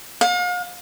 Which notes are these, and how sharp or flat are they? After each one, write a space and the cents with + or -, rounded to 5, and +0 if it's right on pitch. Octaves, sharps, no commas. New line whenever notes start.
F5 +40